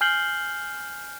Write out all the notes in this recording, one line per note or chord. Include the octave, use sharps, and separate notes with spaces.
G#5 F6 G6 C7 F#7 G7